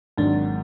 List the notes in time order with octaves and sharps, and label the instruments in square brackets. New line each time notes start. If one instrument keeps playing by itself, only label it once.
[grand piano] G#1 G#2 D#3 F#3 [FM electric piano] D4